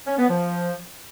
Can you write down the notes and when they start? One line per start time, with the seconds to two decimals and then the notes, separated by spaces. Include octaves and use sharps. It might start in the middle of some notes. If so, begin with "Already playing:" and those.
0.07 C#4
0.18 B3
0.30 F3